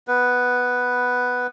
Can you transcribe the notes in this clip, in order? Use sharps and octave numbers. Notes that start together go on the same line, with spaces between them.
B3 B4